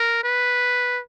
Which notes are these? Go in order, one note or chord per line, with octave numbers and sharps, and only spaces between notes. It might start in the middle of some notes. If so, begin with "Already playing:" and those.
Already playing: A#4
B4